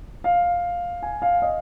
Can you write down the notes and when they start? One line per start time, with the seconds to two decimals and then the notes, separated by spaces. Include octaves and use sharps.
0.24 F5
1.03 G#5
1.22 F5
1.42 D#5